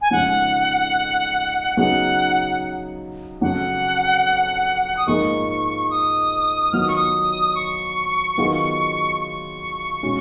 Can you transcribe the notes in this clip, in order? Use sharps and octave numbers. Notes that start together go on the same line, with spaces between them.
G#5
F2 C#3 F3 G#3 D#4 F#5
C#3 F#3 B3 D#4 G#4 F#5
F2 C#3 F#3 F#5
D#6
G#2 F3 A#3 D#4 G#4 C#6
D#6
D#3 F#3 B3 F4 F6
D#6
C#6
D#6
C#6
D#3 F#3 B3 F4 G#4
C#6
B2 G#3 C#4 F#4